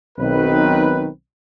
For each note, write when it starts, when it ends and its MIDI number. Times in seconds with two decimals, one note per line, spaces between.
0.19 1.07 35
0.19 1.07 51
0.19 1.07 60
0.19 1.07 71